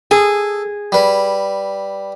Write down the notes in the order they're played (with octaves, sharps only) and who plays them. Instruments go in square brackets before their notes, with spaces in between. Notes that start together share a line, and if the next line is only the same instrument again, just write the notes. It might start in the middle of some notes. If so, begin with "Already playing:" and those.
[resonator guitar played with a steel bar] G#4 [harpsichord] A4
[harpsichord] G3 B4